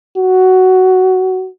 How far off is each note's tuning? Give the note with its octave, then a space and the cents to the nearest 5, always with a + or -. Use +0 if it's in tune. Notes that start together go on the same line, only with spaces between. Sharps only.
F#4 +10